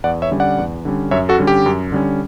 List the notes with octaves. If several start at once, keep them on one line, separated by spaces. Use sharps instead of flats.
E2 D5 F#5
C#5 E5
D3 G3 C#4
D5 F#5
E2
D3 G3 C#4
F#2 C#5 E5
F#4 A4
D3 G3 C#4
G4
F#2
D3 G3 C#4